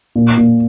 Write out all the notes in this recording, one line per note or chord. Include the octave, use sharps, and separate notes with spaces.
A#2
A#2